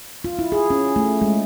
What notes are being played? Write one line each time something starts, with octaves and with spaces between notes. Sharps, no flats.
F4
E4
G#4
C#4
A3
G#3